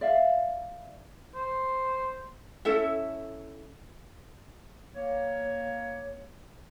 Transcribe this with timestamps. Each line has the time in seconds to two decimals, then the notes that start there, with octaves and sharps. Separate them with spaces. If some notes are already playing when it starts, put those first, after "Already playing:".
0.01 D5 E5 F5
1.35 C5
2.65 C#4 E4 A4 E5
4.94 A#3 C#5